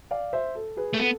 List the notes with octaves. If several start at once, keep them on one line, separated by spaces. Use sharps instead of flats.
D5 F5
C5 E5
A4
G#4 B4
A3
B3 A4